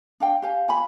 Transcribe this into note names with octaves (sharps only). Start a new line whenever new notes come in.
D4 F5 G5
G4 F5 G#5
F4 G#5 B5